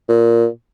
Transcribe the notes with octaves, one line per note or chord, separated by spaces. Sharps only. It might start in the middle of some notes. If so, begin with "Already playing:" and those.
A#2